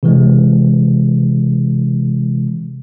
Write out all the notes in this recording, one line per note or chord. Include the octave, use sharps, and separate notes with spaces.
C3 E3 G#3